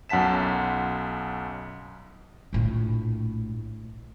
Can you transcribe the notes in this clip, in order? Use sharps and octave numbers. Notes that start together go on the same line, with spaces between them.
B1 F#2 F#5 A5 B6 E7
A#1 A2